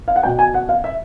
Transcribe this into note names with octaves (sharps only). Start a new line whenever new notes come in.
F5
F#5
B2 G5
G#5
F#5
F5
E5